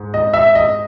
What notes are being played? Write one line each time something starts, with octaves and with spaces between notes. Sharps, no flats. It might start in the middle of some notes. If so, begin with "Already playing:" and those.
Already playing: G#2
D#5
E5
D#5